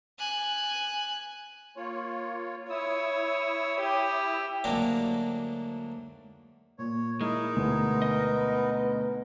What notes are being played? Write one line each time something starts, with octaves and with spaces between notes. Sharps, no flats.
G#5 F#6
A#3 F4 C#5
E4 C#5 D#6 E6
G4
D2 G#2 F#3 A#3 D4 A#5
A#2 C#5
G#3 D#4 E4 A#4
D2 B2 B3
D#5